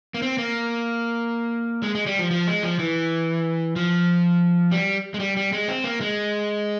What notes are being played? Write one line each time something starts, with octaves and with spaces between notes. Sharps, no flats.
A#3
C4
A#3
G#3
G#3
G3
F3
F3
G#3
F3
E3
F3
G3
G#3
G3
G3
G#3
C4
A#3
G#3